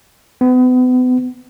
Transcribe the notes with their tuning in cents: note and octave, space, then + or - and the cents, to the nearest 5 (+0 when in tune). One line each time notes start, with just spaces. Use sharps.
B3 +35